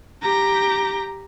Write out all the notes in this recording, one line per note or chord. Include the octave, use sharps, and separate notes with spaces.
G4 A#5